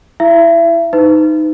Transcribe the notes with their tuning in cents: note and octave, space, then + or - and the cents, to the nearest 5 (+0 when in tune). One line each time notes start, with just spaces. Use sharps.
E4 +0 E5 +35
D#4 +0 B4 +40